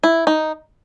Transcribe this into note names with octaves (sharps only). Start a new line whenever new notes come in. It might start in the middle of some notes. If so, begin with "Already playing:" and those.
E4
D#4